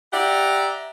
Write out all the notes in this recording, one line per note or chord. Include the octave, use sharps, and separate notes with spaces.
G4 D5 E5 F#5 A#5